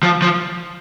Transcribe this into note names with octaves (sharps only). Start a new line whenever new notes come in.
F3
F3